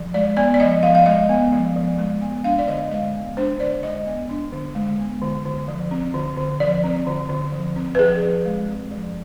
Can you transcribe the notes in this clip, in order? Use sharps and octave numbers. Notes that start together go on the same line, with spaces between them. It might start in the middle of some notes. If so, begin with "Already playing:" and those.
Already playing: F3
G#3 D5
B3 D5
D5
F3 D#5
F3 F5
F5
G#3 D#5
B3
F3
F3
G#3
B3
D4 F5
D5
D3 D#5
G#3 F5
B3
D4 C5
D3 D5
G#3 D#5
B3
D4
D3
G#3
B3
D3
D3
F3
C4
D3
D3
F3 D5
C4
D3
D3
F3
C4
B4
F3 G#4
F3
G#3
C4
F3